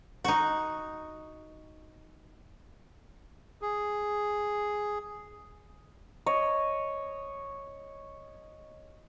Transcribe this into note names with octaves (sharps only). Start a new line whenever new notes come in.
D#4 F#4
G#4
C#5 D#5